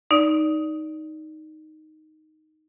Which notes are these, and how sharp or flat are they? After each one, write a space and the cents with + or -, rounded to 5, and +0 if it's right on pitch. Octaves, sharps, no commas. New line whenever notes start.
D#4 +0 D5 -15